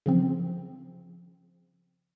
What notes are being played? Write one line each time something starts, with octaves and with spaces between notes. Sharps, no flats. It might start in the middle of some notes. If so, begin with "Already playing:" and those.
C#3 F3 C4